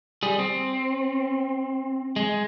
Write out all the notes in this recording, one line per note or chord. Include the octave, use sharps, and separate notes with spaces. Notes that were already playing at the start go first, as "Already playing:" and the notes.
G3 G#4
C4
G#3